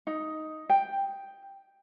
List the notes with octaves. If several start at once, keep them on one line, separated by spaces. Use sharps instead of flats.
D#4
G5